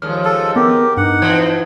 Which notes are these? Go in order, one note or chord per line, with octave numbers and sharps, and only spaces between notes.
D#2 F3 G#3 F6
A4
B3 G4 A#4
G2 D#4 F#5
E3 F3 C4 G#6